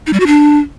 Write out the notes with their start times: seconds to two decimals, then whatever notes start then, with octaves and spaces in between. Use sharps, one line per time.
0.07 D#4
0.13 G3
0.20 F#4
0.27 D4